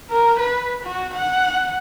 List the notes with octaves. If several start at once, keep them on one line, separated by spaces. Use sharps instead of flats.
A#4
B4
F#4
F#5